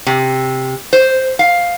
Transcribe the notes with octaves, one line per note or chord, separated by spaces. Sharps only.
C3
C5
F5